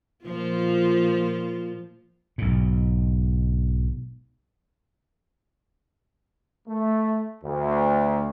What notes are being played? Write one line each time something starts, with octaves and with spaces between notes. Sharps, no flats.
A#2 F3 F4
B1 G#2
A3
D2